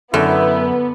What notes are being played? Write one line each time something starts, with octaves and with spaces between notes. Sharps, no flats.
F#2 D3 B3 E4